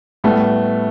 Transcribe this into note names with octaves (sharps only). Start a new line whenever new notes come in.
A2 G3 A3 B3